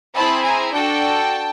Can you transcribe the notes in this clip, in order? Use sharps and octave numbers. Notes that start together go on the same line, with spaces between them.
C4 E4 G#4 A5 B5
G#5 A#5
D4 F#4 A4 G5 A5